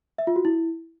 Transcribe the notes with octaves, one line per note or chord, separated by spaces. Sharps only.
E5
F4
F#4
E4